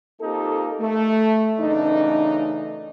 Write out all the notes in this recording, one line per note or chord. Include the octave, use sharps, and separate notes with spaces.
A#3 C4 D#4 F4 G4 A4
A3
F#2 C#3 E3 A3 D4 D#4